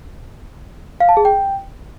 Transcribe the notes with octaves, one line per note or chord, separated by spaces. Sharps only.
F5
A5
G#4
G5